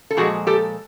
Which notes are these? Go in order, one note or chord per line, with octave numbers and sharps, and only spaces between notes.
A4
A#2 F3 G#3 F#4 G#4
G4 A4